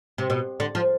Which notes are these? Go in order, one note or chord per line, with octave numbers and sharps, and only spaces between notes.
C3
B2
D3
F3